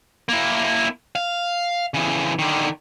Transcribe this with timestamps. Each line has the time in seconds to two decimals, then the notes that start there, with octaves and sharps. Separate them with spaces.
0.29 A#3 E4
1.15 F5
1.94 C#3 E3
2.39 D3 D#3